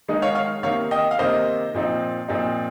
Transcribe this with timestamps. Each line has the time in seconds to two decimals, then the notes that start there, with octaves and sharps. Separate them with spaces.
0.08 D#3 G#3 D#4
0.22 C#5 F5
0.35 C#5 F5
0.63 C3 D#3 A#3 C#5 F5
0.91 D#5 G5
1.11 F5
1.18 C3 D#3 A#3 C5 D#5
1.74 A#2 F3 C4 D#4
2.28 A#2 F3 C4 D#4